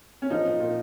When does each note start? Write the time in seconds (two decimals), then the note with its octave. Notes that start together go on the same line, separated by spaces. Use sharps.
0.22 C#4
0.30 F3 D#4
0.45 A#2
0.60 A#2